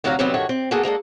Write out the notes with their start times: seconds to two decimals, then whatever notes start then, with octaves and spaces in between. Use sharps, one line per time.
0.04 D2 C3 F#3 F#4 F5 A#5
0.19 C3 D#3 F#3 G3 B3 C4
0.34 G2 D#3 A3 F#4 C#5
0.49 C4
0.71 A#3 B3 F#4 G#4 A4
0.83 G#3 A#3 D4 A4